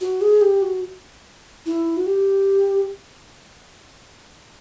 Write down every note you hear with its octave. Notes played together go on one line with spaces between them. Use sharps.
F#4
G#4
G4
F#4
E4
F#4
G4